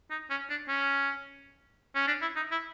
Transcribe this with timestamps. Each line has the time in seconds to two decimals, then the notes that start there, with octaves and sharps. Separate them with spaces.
0.10 D#4
0.30 C#4
0.50 D4
0.68 C#4
1.95 C#4
2.07 D4
2.22 E4
2.36 D#4
2.51 E4